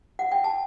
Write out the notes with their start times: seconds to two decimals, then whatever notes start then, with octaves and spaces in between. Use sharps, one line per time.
0.19 F#5
0.32 G5
0.44 A5